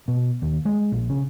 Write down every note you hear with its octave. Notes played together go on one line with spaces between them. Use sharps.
B2
D#2
G#3
A#1
C#3